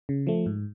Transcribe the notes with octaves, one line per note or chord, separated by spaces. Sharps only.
C#3
F3 A3
G#2